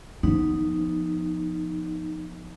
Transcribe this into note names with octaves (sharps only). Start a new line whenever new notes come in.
F3 B3 D#4